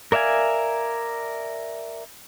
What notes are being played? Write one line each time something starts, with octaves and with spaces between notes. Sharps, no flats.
A#4 D5 E5 F5 G#5